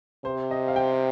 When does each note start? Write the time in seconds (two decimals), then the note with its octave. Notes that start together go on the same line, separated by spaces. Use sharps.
0.25 C3 C5
0.51 D#5
0.68 F5
0.76 G5